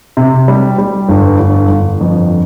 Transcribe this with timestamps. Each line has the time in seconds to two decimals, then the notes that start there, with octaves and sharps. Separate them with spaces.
0.17 C3
0.48 G3
0.78 G3
1.09 G1
1.39 G1
1.69 G1
2.01 F2